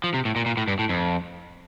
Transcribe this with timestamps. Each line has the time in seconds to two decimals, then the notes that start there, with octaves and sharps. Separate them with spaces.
0.04 F3
0.14 C3
0.25 A2
0.36 A#2
0.46 A#2
0.57 A2
0.68 G2
0.79 A2
0.89 F2